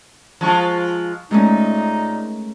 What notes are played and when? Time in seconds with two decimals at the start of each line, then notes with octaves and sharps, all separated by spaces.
0.41 F3 G#3 F4 A5 C#6
1.31 A#2 G#3 A3 C#4 D#4